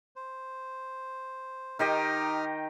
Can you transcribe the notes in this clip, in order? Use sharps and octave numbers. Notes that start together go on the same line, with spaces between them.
C5
D#3 D#4 G4 D#5 D#6 F6